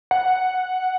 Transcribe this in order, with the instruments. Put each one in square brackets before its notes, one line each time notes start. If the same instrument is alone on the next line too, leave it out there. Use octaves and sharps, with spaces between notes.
[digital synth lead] F#5